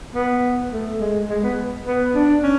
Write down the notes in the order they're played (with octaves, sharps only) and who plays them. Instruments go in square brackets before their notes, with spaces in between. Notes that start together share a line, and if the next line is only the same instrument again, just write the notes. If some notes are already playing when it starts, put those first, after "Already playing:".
[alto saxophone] B3
A3
G#3
G#3
B3
B3
D4
C#4